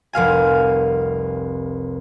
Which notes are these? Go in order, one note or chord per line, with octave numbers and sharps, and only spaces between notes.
F1 C2 F5 G#5